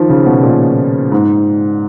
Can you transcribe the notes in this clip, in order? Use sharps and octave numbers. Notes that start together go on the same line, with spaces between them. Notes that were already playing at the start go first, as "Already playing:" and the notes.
Already playing: D#3 F3
C#3
B2
A#2
G#2